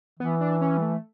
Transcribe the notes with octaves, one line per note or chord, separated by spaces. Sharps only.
E3 B3
D4
C#4
G3
A3